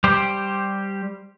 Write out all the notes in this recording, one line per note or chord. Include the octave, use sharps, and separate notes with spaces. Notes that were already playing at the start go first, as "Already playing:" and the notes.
G3 G4 C5